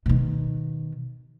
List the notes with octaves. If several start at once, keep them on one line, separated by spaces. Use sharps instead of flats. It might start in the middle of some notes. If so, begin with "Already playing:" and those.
B2 D#3